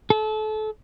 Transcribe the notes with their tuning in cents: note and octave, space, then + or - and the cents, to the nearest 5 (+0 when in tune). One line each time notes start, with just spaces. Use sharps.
A4 -30